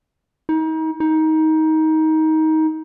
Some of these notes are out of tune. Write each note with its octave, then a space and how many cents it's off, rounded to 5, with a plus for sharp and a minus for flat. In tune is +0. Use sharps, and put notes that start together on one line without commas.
D#4 +35
D#4 +20